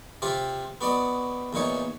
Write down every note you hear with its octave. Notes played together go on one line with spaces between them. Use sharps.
C3 C4 F4 G4
B3 F#4 D5 D#5
E2 A#2 D#4 C#5